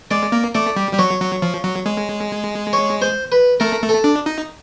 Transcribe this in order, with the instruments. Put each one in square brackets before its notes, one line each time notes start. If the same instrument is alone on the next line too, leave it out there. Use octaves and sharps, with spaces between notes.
[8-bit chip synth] G#3 [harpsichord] D5
[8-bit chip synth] A#3
[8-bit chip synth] A3 [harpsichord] D5
[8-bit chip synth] G3
G3
[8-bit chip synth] F#3 [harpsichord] C#5
[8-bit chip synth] F#3
F3
F#3
G#3
[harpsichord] C#5
C5
B4
[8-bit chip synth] A3 [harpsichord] A#4
[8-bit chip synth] A3
[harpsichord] A4
[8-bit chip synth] D4
D#4